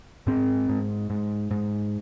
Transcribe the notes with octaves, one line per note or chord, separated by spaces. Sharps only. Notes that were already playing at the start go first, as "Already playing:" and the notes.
G#2 C4
G#2
G#2
G#2